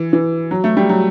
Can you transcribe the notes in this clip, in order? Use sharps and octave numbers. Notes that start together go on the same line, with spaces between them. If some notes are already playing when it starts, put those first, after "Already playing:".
Already playing: E3
E3
F#3
A3
G3
F#3